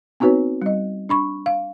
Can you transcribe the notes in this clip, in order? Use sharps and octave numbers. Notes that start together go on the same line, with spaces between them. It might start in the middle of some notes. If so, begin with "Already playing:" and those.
B3 C4 D#4 F#4 B4 C#5
G3 D#5
D4 B5 C#6
F5